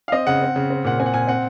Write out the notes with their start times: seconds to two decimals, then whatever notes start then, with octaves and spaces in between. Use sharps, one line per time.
0.08 F5
0.12 C4 D#5
0.27 C#3 F#5
0.42 C4
0.56 C#3
0.70 C4
0.84 A#2 F#5
1.00 C4 G#5
1.06 F#5
1.14 A#2 G#5
1.28 C4 F#5